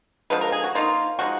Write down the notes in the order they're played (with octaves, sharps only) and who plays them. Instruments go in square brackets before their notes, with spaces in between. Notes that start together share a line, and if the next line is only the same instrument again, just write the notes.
[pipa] D3 F3 G#3 B4
A#4
G#4
F#4
F3 A#3 D#4 F4
F3 G#3 D#4 F#4